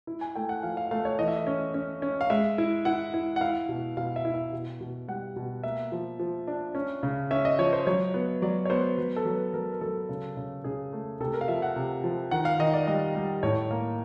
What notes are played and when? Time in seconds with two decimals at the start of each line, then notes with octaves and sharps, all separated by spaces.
0.07 E4
0.21 G#5
0.35 A3 G5
0.49 F#5
0.63 F3 F5
0.77 F5
0.91 A3 F5
1.05 C#5
1.19 E3 D#5
1.28 E5
1.36 D#5
1.47 C#4
1.74 C#4
2.02 C#4
2.21 F5
2.30 G#3 E5
2.58 E4
2.85 E4 F#5
3.14 E4
3.36 F#5
3.41 E4 F5
3.69 B2
3.97 B2 F5
4.16 E5
4.25 E4
4.34 E5
4.53 B2
4.81 B2
5.08 G3 F#5
5.36 B2
5.63 A#3 E5
5.92 F3
6.19 F3
6.47 D4
6.75 C#4
7.03 C#3
7.31 C#4 E5
7.45 D#5
7.59 F3 C#5
7.73 C5
7.87 F#3 C#5
8.14 B3
8.42 F#3 D5
8.65 C#5
8.70 B3 C5
8.98 F#3 B4
9.16 A4
9.25 F#3
9.35 B4
9.53 F#3 A#4
9.73 A#4
9.81 F#3 A4
10.09 C#3
10.37 C#3
10.64 C#3 G#4
10.93 A3
11.20 C3 A4
11.34 A#4
11.41 F5
11.48 F3 E5
11.62 F#5
11.76 C3
12.04 F3
12.31 D#3 F#5
12.45 F5
12.59 D#3 D#5
12.73 D5
12.87 G3 D#5
13.15 G3
13.43 A2 C#5
13.71 A#3